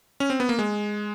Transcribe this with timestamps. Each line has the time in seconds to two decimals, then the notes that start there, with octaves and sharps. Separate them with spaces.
0.20 C#4
0.30 C4
0.40 B3
0.49 A#3
0.59 G#3